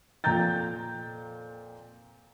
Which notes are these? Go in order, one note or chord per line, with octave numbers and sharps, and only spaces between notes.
F2 A#2 G5 A#5 G6 A6